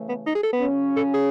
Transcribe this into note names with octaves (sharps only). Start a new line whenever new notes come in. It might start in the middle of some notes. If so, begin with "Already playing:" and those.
Already playing: C#3 E3 A3
B3
D#4
G#4
A4
B3
C#3 F#3 C#4
A4
G#4